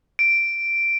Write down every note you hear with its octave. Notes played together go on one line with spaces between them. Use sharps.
D7